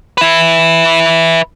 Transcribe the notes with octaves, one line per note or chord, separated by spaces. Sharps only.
B4 E5